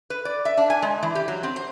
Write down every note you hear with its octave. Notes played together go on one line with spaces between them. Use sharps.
B4
D5
E5
D4
G#5
G#3
E3
G4
F#3
C4
C5